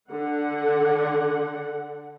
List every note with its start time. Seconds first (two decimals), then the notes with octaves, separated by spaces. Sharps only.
0.10 D3 F#5